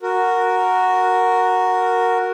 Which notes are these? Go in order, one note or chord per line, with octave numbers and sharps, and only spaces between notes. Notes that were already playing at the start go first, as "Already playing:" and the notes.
F#4 A#4